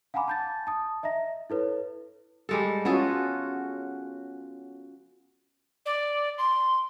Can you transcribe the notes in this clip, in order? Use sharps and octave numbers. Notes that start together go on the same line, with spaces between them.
F5 F#5 G#5 A#5 B5 D6
A5 G6 A6
A5 D#6
D#5 E5 A#5 A#6
E4 A4 B4 C#5
G3 G#3 A4
B3 C#4 F4 F#4 G#4 A4
D5
C6